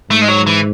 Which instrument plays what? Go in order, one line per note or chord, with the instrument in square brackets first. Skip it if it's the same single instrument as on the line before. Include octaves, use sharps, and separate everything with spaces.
[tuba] G#2 [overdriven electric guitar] A3
[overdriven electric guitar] G#3
F#3
E3